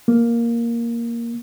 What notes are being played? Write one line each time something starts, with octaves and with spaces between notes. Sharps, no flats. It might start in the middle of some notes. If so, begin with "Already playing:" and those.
A#3